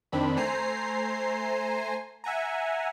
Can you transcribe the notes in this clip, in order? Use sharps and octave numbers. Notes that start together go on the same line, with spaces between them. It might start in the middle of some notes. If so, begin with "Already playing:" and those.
F2 D#3 C4 D4 B5
A3 C5 G#5 A#5 C7
E5 F#5 G#5 A#5